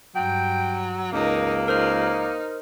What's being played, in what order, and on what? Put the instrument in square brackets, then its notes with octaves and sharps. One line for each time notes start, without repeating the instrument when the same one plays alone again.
[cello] G2 [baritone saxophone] F#3 [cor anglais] G5
[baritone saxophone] C#2 [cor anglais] A#3 [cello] D#4 A#4
[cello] D#4 [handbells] A#4 C5 F6